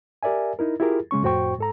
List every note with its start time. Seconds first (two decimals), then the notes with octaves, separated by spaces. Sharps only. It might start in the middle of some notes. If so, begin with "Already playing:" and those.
0.23 G4 A#4 D5 E5 G#5
0.59 D#4 E4 A#4
0.80 E4 F4 G4 G#4 A#4
1.11 C#3 G#3 C#4 C#6
1.23 F2 A2 F#4 C5 G5 C#6
1.58 G#2 A4 A#5